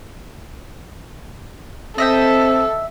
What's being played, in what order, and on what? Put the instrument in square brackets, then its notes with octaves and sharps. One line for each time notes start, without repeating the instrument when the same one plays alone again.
[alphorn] C4 [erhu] A4 [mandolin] D#5 E5 G5